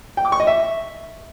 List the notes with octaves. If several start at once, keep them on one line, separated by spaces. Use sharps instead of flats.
G5
D6
C#6
D#5
E5